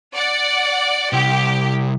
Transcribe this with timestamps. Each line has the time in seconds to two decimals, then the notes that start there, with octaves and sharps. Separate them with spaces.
0.15 D5 F#5
1.13 C2 G4